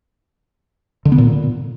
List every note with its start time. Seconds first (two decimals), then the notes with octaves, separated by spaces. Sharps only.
1.05 D3
1.12 B3
1.18 A#2